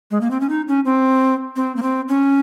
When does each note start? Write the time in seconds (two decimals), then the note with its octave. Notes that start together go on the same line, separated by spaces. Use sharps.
0.11 G#3
0.21 A#3
0.31 C4
0.40 C#4
0.49 D#4
0.68 C#4
0.85 C4
1.56 C4
1.76 A#3
1.82 C4
2.08 C#4